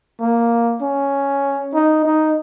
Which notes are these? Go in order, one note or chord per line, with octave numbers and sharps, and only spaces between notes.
A#3
C#4
D#4
D#4